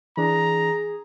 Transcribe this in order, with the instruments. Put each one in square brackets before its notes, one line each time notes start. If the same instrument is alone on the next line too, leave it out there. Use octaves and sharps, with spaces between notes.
[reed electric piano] E3 D4 [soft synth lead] G#4 [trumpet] A#5